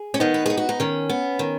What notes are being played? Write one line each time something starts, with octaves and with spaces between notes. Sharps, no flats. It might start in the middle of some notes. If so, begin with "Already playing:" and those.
Already playing: G#4
C#4
D#3 B3 D#4
B4
B3 G#4
F#4
D#4
D#3 C#4
B3
D#3